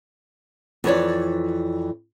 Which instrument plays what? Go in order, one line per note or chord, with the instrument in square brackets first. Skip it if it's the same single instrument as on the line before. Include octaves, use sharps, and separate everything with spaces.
[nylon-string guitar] F2 E3 C#5 D5